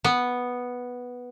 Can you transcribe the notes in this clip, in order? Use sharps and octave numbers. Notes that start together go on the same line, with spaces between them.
B3